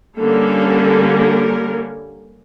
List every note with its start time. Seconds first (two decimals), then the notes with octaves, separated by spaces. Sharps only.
0.20 D3 G3 A#3 C#4 A4
1.19 A#4